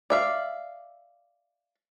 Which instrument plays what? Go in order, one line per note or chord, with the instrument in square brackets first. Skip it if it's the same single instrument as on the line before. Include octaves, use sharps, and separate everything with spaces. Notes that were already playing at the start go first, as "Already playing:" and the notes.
[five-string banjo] D5 E5 F5